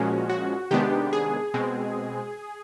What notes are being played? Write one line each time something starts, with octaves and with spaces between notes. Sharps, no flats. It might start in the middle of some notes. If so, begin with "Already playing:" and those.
Already playing: A#2 F3 G#3 C#4 F#4
F#4
C3 D#3 G#3 B3 D4 G4
G#4
B2 G#3 C4